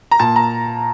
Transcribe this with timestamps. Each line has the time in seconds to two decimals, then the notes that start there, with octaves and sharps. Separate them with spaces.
0.11 A#5
0.20 A#2 A5
0.36 A#5